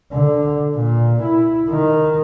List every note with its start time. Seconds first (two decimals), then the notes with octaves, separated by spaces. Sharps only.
0.12 D3
0.76 A#2
1.23 E4
1.70 D#3